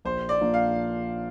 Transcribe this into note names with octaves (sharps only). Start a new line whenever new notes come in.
A#1 C5
D5
A#2 F3 A#3 D4
F5